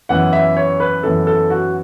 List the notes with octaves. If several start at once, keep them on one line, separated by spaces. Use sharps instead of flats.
F#2 E3 B3 F#5
E5
C#5
B4
F#2 E3 B3 A4
A4
F#4